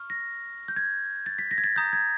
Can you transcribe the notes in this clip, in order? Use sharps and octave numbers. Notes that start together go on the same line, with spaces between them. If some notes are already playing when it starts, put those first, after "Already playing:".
Already playing: C#6 F6
A#6
G6
G#6
A6
B6
A#6
G#6
A6
A#5 D#6 G6
G#6